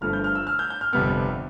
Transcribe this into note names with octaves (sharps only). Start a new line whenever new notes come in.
G1 G2 F3 A3 F6
G6
F6
E6
F6
G6
G6
F6
G1 F2 C3 G3 B3 F6